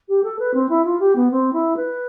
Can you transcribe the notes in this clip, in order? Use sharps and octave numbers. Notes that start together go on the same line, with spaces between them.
G4
A4
B4
C4
E4
F4
G4
B3
C4
E4
B4